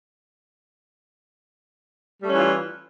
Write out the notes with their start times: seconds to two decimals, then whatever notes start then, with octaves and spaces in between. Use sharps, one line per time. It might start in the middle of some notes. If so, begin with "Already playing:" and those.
2.19 G3
2.24 A3
2.29 C#4
2.34 E3
2.39 F4